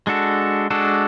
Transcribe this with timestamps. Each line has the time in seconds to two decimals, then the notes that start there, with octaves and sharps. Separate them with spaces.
0.07 G#3 D4 F#4 A4
0.70 G#3 D4 F#4 A4